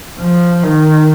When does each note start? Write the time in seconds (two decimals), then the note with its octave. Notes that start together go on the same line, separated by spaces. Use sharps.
0.20 F3
0.64 D#3